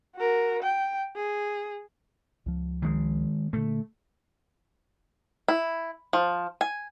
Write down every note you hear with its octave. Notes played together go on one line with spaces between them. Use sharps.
F#4 A#4
G5
G#4
C#2 F3
D#3 G#3
A#2 D3 A3
E4
F3
G#5